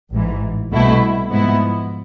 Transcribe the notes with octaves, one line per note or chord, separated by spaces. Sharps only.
A1 G#2 E3
C2 B2 A3 E4
G#2 F3 B3 E4